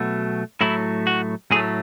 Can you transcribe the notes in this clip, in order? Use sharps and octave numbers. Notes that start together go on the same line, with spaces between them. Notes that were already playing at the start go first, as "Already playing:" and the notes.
Already playing: B2 F#3 A3
A2 F#3 A3 E4
F#4
A2 F#3 A3 G#4